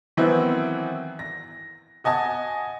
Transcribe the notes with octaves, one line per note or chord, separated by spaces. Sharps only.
D#3 E3 F#3 B3 C4 E4
A#6
F#4 D#5 G#5 A5 D#6